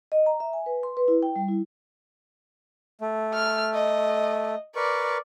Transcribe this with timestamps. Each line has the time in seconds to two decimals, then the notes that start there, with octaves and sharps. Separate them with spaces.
0.12 D#5
0.26 A#5
0.40 E5
0.53 G#5
0.66 B4
0.83 C6
0.97 B4
1.08 E4
1.23 G5
1.36 G3
1.49 E4
3.01 A3
3.34 F6
3.74 D#5
4.76 A#4 B4 D5 C#6